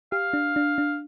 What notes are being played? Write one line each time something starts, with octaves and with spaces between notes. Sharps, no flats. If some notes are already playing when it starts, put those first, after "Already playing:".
G4 F5
D4
D4
D4